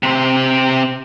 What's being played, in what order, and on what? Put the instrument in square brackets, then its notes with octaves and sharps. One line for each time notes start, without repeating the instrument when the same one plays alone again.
[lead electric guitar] C3 C5